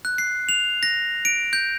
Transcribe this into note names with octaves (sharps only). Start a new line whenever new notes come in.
F#6
C7
F7
A#6
D7
G6